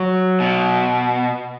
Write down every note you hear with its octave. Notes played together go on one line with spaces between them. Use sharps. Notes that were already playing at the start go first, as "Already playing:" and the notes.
Already playing: F#3
B2